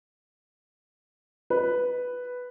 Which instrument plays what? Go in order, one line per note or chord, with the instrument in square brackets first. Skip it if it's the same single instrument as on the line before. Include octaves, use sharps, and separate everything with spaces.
[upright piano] B4